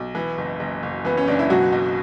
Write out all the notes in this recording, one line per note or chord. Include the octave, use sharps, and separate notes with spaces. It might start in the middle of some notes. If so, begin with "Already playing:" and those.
Already playing: B1
E3
F#1
F#1
F#1
E3 B3
C#4
F#1 D4
E4
B2 F#3 F#4
B1